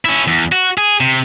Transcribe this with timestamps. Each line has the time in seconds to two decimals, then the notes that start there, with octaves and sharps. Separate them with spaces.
0.05 C#4 E4
0.27 E2
0.52 F#4
0.78 G#4
1.00 C3